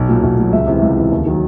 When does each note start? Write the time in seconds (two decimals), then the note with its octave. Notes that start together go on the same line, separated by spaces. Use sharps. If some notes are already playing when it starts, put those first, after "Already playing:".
Already playing: B1
0.08 A#2 F#3
0.23 B1
0.38 A#2 F#3
0.52 C#2 E5
0.67 C3 E3
0.82 C#2
0.97 C3 E3
1.12 D#2
1.26 D#3 F#3